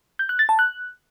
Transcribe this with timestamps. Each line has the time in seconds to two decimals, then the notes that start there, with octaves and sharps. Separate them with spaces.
0.19 G6
0.29 F#6
0.39 A6
0.49 A5
0.59 F#6